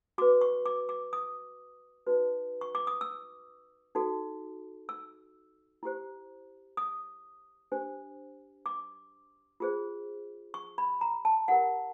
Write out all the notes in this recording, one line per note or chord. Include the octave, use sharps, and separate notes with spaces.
F#4 B4 D6
C#6
D6
D6
D#6
D#4 F#4 B4
C#6
D6
D#6
E6
D#4 F#4 A4
E6
E4 G4 C5
D#6
D4 G4 C5
D6
F4 G#4 C5
C#6
B5
A#5
A5
E4 G4 A#4 F#5